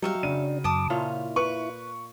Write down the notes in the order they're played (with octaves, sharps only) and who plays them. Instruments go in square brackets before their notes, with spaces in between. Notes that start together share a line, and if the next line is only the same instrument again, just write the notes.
[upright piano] F#3 [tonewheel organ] G3 [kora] D#4 G5 [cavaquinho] C#5 E5 F5
[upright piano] C#3 F#4 D#7 [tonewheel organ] D4
[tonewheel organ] F#2 D6 [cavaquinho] A5 D#6
[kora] A#2 F4 C#5 [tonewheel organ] E4
[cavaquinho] B4 [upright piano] C#6